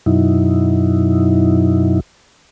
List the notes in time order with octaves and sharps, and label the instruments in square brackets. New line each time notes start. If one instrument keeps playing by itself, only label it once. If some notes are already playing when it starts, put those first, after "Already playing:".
[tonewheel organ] F#2 B2 F#3 D#4 E4